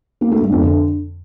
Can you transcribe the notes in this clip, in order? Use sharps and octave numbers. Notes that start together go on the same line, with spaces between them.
A#3
A3
G2
F2
D3